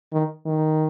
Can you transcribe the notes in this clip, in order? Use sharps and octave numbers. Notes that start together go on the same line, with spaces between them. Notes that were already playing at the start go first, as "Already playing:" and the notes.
D#3
D#3